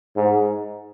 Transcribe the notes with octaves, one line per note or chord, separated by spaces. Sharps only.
G#2